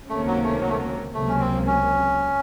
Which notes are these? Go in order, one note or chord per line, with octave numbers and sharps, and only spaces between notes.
C#2 C3 D#3 A3 A#3 C#4
F#3
A3
F#3
A3
F#3
C#2 C3 F#3 A3 A#3
C#4
C4
C#4